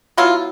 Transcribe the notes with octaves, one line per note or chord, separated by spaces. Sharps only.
F#3 B3 E4 F4